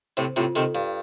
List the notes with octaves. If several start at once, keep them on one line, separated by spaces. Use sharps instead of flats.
A2 C3 C5
A2 C3 F4
C3 D#3 A4
G2 F5